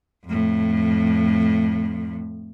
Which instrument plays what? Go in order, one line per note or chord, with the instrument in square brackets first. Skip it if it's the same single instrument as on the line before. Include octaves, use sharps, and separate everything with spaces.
[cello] F2 A2